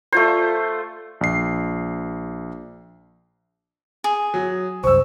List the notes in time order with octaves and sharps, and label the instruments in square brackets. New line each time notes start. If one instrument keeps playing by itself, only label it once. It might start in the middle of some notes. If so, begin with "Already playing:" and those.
[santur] A3 F4 C5
[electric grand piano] A#1 C7
[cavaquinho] G#4
[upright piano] F#3
[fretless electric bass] C2 F#2 [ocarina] C5 [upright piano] C#6 E6